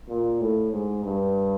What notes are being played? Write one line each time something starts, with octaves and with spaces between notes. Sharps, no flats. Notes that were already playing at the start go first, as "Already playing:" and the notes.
A#2
A2
G#2
G2